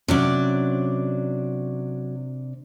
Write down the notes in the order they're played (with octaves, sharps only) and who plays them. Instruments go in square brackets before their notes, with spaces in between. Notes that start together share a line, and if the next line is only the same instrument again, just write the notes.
[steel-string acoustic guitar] C3 D4 D5 [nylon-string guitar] F#3 C#4